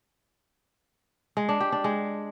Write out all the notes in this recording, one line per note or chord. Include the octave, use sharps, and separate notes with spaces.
G#3
D4
G4
D4
G#3